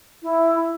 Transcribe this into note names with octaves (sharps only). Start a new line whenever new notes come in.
E4